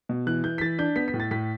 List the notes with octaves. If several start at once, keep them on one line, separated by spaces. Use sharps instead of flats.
B2
E3 F#6
E3 G6
B6
E3 A6
D4 G6
B3 B6
B6
A2
A6
A2 B6